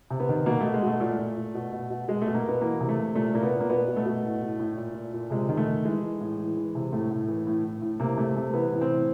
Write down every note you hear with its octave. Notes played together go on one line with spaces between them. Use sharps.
C3
B3
D#3
B2 A#3
B2 A3
G#3
B2 A3
A#2 A3
A#2
A#2
B2
B2
B2
B2 G#3
B2 A3
A#3
B2 B3
E3 A#3
C3
A3
C3
A#2 A3
A#2 A#3
B3
A#2
A#3
B2 B3
B2
A3
B2
A2
A2
A2
A#2
A#2
A#2
C3 G#3
D#3
A3
D#3
E3 G#3
E3
A2
E3
E3
C3
A2 A3
A2
E3
A2
A2
A2
C3 A#3
C3 A3
C3 A3
E3 B3
A2
C4
E3